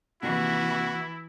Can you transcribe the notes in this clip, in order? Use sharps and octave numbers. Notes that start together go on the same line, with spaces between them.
D#2 C3 E3 E4 F#4